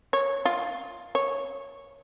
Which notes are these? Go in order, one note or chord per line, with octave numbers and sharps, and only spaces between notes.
C#5
F4
C#5